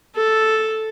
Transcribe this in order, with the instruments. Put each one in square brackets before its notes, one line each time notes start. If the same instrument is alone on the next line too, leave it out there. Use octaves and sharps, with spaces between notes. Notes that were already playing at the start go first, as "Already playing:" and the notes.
[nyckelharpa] A4